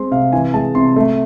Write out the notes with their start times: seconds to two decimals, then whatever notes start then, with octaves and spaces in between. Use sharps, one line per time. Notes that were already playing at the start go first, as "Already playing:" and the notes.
Already playing: G#3 C4 C6
0.11 C3 F5
0.33 E3 G#5
0.54 G#3 A5
0.75 C3 C6
0.96 A3